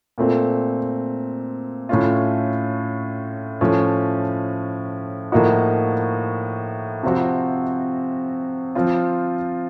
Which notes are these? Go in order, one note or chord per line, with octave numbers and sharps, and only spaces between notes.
A#2 A3 C4
A2 A3 C#4 F4
A2 F3 A3 C#4
A2 F3 A#3 D#4 F#4
C3 F3 C4 F#4
F3 C4 F4